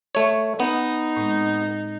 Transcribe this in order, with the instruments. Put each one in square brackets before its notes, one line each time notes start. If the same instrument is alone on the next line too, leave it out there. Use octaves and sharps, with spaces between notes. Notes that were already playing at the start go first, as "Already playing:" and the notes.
[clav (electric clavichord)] A3 C#5
[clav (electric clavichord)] B3 [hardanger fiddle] D#4
[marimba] A2 G#3 C4